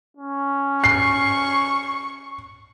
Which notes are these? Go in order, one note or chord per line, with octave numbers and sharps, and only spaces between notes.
C#4
C#6 C7